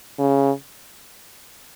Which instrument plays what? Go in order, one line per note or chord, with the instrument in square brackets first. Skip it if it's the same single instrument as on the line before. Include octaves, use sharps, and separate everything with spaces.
[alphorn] C#3